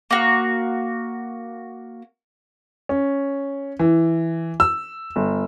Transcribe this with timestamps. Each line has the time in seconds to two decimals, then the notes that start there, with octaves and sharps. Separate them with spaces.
0.11 A#3 F#4
2.89 C#4
3.79 E3
4.60 E6
5.16 G1